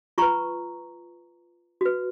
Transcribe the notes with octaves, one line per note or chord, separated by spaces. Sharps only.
F4 B4 A#5 C#6
F#4 B4